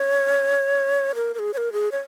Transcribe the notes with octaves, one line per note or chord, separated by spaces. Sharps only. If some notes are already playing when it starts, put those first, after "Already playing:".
Already playing: C#5
A#4
A#4
G#4
C#5
A#4
G#4
C#5